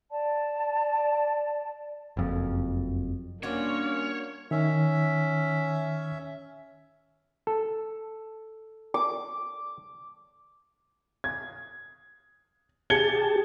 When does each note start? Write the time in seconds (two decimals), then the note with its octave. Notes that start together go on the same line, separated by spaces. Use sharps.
0.11 D5 A5
2.17 F#1 F2
3.43 G3 A#3 C#4 D4 F4 F#4 C#5
4.51 D#3 C#4 E5
7.47 A4
8.94 D6
11.24 G#6
12.90 G4 G#4 A5 G#6 C#7 G7